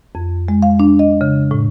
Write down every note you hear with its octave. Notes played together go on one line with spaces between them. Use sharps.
F2
G#3
F5
D4
D#5
C#3
A2